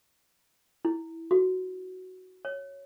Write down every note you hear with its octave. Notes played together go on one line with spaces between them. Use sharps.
E4
F#4
C#5